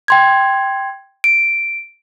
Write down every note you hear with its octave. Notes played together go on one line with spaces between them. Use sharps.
G5 C6 G#6
D7